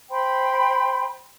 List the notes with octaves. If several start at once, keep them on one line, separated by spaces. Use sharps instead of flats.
C5 G5 B5 C6